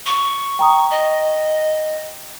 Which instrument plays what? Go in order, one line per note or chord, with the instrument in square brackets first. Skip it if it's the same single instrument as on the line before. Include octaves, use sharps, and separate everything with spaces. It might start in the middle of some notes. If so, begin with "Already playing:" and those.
[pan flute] C#6
[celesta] G5 A#5 D#6
[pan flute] D#5